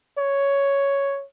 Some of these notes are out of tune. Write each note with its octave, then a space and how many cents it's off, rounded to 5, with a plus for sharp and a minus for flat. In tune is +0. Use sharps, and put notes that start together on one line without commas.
C#5 +5